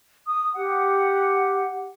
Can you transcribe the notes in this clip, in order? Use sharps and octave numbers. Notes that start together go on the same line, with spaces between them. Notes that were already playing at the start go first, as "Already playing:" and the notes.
D#6
G4 F#5